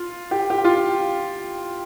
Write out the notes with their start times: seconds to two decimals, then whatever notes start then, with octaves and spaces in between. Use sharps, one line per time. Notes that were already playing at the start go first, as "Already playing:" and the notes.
Already playing: F4
0.31 G4
0.50 G4
0.65 F4